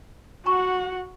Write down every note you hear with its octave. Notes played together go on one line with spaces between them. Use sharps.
F#4 F#5 G#5 A#5 C#6